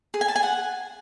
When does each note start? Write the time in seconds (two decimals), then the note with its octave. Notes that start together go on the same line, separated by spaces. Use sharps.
0.14 G#4
0.21 G#5
0.28 A5
0.36 G#5
0.43 F#5